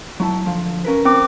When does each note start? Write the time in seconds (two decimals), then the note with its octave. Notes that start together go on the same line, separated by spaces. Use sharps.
0.20 F#3 E4 A5
0.46 D3 F3
0.85 C#4 A#4 B4
1.05 C4 D6